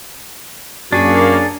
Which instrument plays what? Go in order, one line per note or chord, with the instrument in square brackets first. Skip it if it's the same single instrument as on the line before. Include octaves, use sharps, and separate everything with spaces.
[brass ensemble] F#2 [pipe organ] A#3 [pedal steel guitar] D4 G#4 [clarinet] F#4